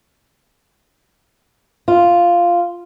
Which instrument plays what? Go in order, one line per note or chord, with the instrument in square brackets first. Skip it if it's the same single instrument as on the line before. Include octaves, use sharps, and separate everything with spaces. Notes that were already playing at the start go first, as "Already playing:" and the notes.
[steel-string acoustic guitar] F4